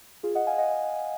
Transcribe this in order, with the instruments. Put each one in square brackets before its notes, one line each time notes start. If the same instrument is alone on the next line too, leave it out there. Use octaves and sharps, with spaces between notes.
[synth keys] F4 G#4
D#5 F#5
F5 G#5
D#5 F#5